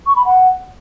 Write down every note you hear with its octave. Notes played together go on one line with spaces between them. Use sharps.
C#6
B5
F#5